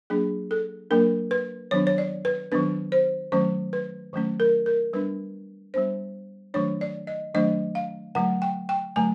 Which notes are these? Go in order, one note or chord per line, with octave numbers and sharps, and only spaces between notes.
F#3 A#3 D4 G#4
A4
F#3 A#3 D4 A#4
B4
D#3 F#3 B3 D4 C#5
C#5
D5
B4
D#3 F#3 B3 D4 B4
C5
D#3 F#3 A3 C#4 C5
B4
D#3 F#3 A3 C#4
A#4
A#4
G3 B3 D4 B4
G3 B3 D4 C5
D#3 F#3 A3 D4 C#5
D5
D#5
D#3 F#3 A3 D4 D#5
F5
D3 F#3 A3 F#5
G5
G5
D3 F#3 A3 G#5